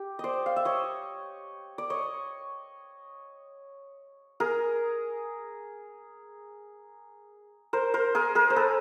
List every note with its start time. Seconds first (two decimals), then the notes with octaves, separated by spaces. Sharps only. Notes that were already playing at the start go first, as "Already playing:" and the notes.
Already playing: G4
0.19 C5 D5 D#5
0.46 F5
0.56 E5
0.65 C#5 D#5
1.78 D5
1.90 C#5 D#5
4.40 G#4 A#4
7.73 A#4 C5
7.94 A#4 C5
8.15 G#4 A#4
8.35 G#4 A#4
8.50 C5
8.56 A4 B4